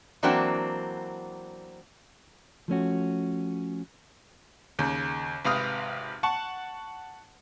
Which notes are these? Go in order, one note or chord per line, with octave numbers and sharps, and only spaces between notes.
E3 F#3 A#3 C4 D4 F#4
F3 A3 C#4 F#4
D#2 C#3
G#1 C3 B4 F5 D#6 F6
F#5 A5 C#6